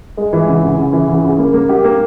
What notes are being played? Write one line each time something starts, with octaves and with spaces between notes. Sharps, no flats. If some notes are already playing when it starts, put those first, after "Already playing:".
G#3
E3
C#3
C#3
C#3
E3
C#3
C#3
A#3
A#3
G4
A#3